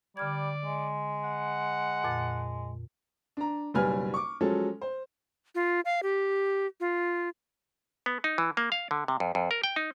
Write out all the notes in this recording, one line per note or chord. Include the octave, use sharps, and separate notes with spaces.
D3 G3 D5 F6 G#6
G#3
F#5
F2 A#2 A6
D4 A#5
F#1 B1 G3 B4 G#5 F6
C#6 D6
F3 F#3 G#3 C#4 A4
C5
F4
F5
G4
F4
B3
D#4
E3
A#3
F5
D3
C3
F2
F2
A#4
G5
D#4